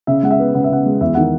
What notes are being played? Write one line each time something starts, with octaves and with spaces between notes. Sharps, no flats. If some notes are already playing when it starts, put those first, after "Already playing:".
C#3 E5
G#3 F#5
E5
B3
C#3 F#5
E5
C#3 F#5
G#3
E2 E5
D#3 F#5